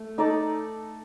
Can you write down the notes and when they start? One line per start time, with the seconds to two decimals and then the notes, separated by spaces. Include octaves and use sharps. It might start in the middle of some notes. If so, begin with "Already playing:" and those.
Already playing: A3
0.18 D#4 A4 D5